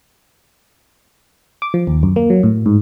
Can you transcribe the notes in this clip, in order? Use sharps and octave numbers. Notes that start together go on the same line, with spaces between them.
D6
F3
D#2
F#2
A#3
F#3
A2
G#2